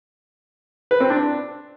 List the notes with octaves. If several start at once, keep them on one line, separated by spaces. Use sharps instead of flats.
B4
C4
D4